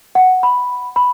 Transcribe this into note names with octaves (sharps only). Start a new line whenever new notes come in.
F#5
B5
B5